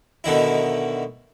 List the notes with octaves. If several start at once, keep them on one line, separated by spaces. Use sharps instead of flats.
B2 D3 D#3 E4